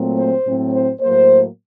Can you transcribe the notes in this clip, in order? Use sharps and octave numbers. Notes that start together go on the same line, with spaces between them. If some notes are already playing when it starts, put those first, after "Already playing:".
Already playing: A#2 F#3 A3 C4
C5
A2 F#3 C4
C5
A2 F#3 A#3 C5